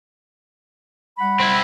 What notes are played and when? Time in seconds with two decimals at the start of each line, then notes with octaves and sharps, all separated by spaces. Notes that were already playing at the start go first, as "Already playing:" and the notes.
1.18 G3 F#5 B5
1.40 C4 E4